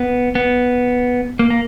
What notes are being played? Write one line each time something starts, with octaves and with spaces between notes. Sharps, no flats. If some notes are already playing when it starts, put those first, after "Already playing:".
Already playing: B3
B3
A#3
A#3